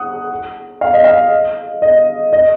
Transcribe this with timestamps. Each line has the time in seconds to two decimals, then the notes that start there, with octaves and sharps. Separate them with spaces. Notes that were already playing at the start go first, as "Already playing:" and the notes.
Already playing: F#5 D#6
0.81 F5
0.93 D#5
1.04 F5
1.82 D#5
2.33 D#5